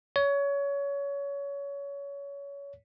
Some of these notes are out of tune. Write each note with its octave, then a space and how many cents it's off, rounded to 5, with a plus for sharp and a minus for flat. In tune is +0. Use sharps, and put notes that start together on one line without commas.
C#5 +25